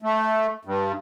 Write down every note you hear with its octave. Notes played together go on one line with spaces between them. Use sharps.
A3
G2